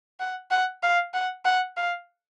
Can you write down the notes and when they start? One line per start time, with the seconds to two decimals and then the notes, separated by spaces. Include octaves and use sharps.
0.20 F#5
0.51 F#5
0.82 F5
1.14 F#5
1.45 F#5
1.76 F5